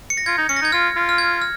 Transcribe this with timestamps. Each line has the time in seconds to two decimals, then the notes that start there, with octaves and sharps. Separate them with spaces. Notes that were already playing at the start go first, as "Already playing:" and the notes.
0.10 C#7
0.17 A#6
0.26 F4 G#6
0.38 D#4
0.49 C#4 C#7
0.57 A#6
0.61 D#4
0.65 G#6
0.72 F4 F6
0.96 F4
1.09 F6
1.18 G#6
1.42 F6